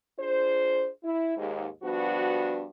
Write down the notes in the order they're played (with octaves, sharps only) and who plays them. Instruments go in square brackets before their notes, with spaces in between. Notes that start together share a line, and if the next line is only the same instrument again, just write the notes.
[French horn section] D4 F4 G#4 C5
E4
D#2 G#2
G2 F3 B3 D4 F#4